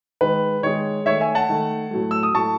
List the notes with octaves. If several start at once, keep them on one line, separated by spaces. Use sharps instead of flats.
D#3 G#3 B4
D#3 G#3 C#5
D#3 A3 C#5 E5
E5 G#5
F#5 A5
D#3 A3
A2 F#3 A3
E6
D#6
A2 F#3 A3 A5 C#6